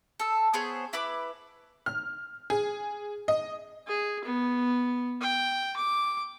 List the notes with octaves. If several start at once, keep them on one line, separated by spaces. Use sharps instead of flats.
A4 E6
B3 G#4 C5 C#5
E4 B4 B5 D6
F6
G#4
D#5
G#4
B3
G5
D6